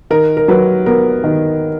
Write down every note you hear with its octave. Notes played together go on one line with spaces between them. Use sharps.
D#3 A#4
A#4
F#3 B4
B3 A#4
D#3